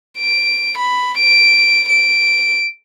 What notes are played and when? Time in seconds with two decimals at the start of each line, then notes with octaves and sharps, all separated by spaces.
0.18 D7
0.78 B5
1.18 D7
1.89 D7